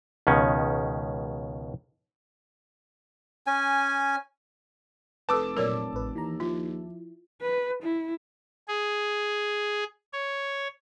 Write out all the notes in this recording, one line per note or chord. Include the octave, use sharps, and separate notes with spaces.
C#2 B2 D#3 C#4
C#4 G#5
F1 A4 B4 A5 D6 E6
A#2 F#3 A#4 C#5 D5
A1 B4
D#2 E3 A#5
F3 E4 F4
B4
E4
G#4
C#5